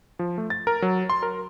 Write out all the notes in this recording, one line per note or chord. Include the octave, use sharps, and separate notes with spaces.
F3
A3
A6
A#4
F#3
C6
A#4